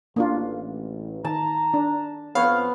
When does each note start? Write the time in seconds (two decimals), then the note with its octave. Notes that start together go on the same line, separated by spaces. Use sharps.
0.16 A1 A#3 D4 F4
1.25 D#3 A5 A#5
1.74 D4
2.35 F2 B3 C#5 F5